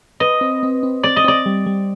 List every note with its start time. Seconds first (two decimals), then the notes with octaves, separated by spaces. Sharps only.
0.20 B4 D#5
0.41 C4
0.63 C4
0.83 C4
1.03 C4 D5
1.16 D#5
1.24 C4 D5
1.46 G3
1.66 G3